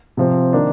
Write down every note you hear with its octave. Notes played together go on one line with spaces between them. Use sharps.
C3 F3 C4
D#3 A#3 D4